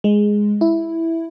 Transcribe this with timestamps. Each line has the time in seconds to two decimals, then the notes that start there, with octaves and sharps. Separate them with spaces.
0.04 G#3
0.61 E4